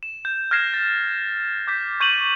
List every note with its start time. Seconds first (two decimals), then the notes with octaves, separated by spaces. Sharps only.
0.03 E7
0.25 G6
0.51 F6 G#6 A#6 C7 E7
0.74 A6
1.67 D6 G6 B6
2.00 C#6 G6 D#7 E7 F#7